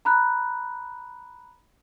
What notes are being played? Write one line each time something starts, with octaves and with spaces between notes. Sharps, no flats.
A#5 B5 F#6